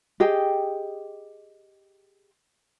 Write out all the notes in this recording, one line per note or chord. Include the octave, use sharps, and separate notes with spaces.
G4 G#4 D#5 G5